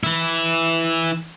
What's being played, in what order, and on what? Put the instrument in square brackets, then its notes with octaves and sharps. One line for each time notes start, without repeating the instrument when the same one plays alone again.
[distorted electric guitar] E3 E4